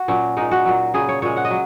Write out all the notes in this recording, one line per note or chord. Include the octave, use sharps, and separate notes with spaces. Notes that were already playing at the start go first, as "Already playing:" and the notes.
Already playing: F#4
A#2 F#3 C#4
A#2 G#3 D#4
F#4
A#2 F#3
C#3 F#3 G#4
C#5
A#2 G#3 C#5
F#5
D#5
F#3